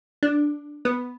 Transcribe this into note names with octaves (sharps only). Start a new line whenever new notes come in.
D4
B3